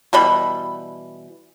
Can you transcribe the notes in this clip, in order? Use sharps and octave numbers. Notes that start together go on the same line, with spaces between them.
B2 E3 G3 B5